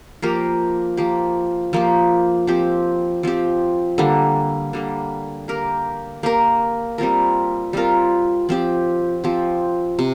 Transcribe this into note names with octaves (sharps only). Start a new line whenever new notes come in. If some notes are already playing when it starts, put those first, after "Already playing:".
F3 A#3 G4 A#4
F3 A#3 G4
F3 A#3 G4
F3 C4 G4
F3 C4 G4
D3 G3 A#3
D3 G3 A#3
A#3 G4 A#4
A#3 G4 A#4
G3 C4 F4 A#4
G3 C4 F4 A#4
F3 C4 G4
F3 C4 G4
C3